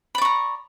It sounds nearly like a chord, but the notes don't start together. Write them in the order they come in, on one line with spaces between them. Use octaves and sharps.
B5 D5 C#6 A#5